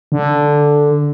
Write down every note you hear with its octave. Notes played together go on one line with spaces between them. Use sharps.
D3